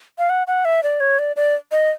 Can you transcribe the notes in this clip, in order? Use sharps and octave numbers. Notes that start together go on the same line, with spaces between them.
F5
F#5
F#5
E5
D5
C#5
D5
D5
D#5